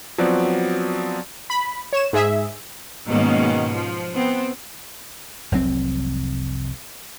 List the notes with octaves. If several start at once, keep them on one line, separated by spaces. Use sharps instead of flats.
F3 F#3 B3 C4 F#4 D5
B5
C#5 E7
G#2 G#4 E5
G#2 B2 D#3 A#3 C#4
F3
B3 C4
F1 C2 F#3 C4